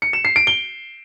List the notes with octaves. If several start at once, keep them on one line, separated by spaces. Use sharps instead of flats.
C#7
E7
C7
D7
G7